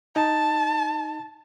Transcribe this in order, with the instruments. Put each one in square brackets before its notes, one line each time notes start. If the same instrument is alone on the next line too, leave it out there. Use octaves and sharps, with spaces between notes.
[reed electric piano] D#4 [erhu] A5